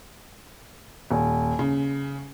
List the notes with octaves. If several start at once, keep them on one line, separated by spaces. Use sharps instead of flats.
D#1
C#3